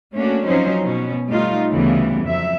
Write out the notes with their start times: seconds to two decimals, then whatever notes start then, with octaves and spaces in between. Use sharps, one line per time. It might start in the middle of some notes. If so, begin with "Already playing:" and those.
0.14 A3 A#3 C#4 D4 F#4
0.47 F3 F#3 C4 C#4 D#4 C5
0.84 B2 C#4
1.27 G3 A3 D#4 F4
1.71 D2 C#3 E3 G3 B3
2.25 F2 F#3 E5